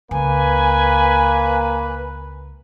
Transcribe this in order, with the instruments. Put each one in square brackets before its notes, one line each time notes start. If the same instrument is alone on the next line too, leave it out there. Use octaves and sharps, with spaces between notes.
[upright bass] C#2 [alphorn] A#3 [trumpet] B4 [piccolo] G#5